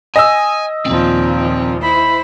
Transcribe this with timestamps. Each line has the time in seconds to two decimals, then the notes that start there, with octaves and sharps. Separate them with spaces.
0.16 D#5 G#5 E6
0.86 D#2 A#2 F3 C4
1.83 E4 C5 B5